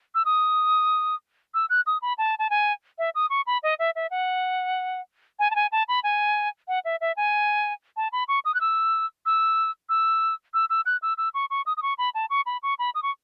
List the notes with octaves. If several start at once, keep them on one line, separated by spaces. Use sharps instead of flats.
E6
D#6
E6
F#6
D#6
B5
A5
A5
G#5
E5
D#6
C#6
B5
D#5
E5
E5
F#5
G#5
A5
G#5
A5
B5
G#5
F#5
E5
E5
G#5
A5
B5
C#6
D#6
F#6
E6
E6
E6
E6
E6
F#6
E6
E6
C#6
C#6
D#6
D#6
C#6
B5
A5
C#6
B5
C#6
B5
D#6
C#6